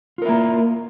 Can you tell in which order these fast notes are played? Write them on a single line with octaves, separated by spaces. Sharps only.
F4 A#4 E4 A#3